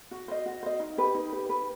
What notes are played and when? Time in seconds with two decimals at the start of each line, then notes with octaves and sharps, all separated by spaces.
0.11 F#4
0.28 C5 D#5
0.46 F#4
0.63 C5 D#5
0.80 D#4
0.98 G4 B4
1.15 D#4
1.32 G4 B4
1.49 B4